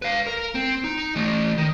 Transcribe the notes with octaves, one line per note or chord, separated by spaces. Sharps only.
B4 F5
A#4
C4
D#4
E3 A3
D#3